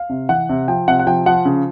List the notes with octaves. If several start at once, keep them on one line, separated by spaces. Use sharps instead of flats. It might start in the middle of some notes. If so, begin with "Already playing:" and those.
Already playing: F5
C3
E3 F#5
C3
F3 G5
C3 F#5
F#5
F3 G5
F3 F#5
C#3